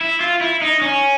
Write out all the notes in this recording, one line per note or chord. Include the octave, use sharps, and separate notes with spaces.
E4
F4
E4
D#4
C#4